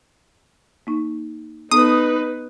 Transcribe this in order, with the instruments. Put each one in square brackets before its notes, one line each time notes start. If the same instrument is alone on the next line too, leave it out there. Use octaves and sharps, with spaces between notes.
[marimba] A#3 D#4
[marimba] B3 A4 [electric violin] D#4 B4 [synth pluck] D#6